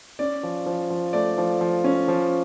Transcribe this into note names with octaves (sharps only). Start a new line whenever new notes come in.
C#4 D5
F3
F3
F3
A3 D5
F3
F3
C#4
F3